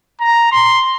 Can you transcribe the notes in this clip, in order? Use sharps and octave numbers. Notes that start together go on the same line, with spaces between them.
A#5
C6